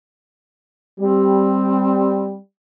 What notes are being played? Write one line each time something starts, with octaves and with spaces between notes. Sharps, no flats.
G3 C4